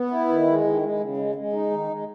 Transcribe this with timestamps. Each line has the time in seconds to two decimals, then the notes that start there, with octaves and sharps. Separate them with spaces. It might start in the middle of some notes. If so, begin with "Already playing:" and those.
Already playing: B3
0.11 E4
0.29 D#3
0.47 G#3
0.64 D#3
0.82 G#3
0.99 C#3
1.17 G#3
1.35 G#3
1.53 D#4
1.71 D#3
1.88 G#3